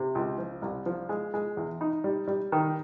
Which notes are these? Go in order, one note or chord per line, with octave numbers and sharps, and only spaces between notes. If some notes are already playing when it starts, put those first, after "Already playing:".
Already playing: C3
C#2
F3
C2
F3
G#3
G#3
E2
D#4
G3
G3
D#3